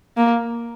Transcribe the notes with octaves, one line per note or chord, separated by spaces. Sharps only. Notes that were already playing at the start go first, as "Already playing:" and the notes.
A#3